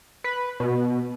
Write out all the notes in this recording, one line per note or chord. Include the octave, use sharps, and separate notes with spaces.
B4
B2